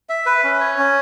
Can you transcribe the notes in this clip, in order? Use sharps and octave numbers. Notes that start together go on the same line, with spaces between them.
E5
B4
C#4
C#5
C#4